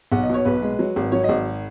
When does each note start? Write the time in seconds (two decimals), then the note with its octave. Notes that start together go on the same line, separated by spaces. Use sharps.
0.12 B1 F#5
0.23 D#5
0.29 B2 C#5
0.45 B1 B4
0.62 G#3
0.79 F#3
0.96 G#1
1.12 F#3 C#5
1.24 G#1 D#5